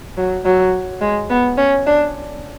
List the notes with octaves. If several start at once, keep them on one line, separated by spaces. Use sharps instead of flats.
F#3
F#3
G#3
B3
C#4
D4